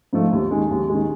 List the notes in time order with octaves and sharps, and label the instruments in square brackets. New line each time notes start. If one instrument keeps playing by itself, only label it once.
[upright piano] G#2 F3 A3
D#2
D#3 G#3
D#2
D#3 G#3